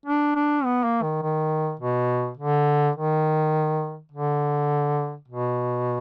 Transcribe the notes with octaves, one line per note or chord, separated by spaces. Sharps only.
D4
D4
B3
A#3
D#3
D#3
B2
D3
D#3
D3
B2